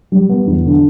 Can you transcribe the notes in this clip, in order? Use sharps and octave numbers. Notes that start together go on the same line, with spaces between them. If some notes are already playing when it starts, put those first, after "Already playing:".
G3
B3
E2
D3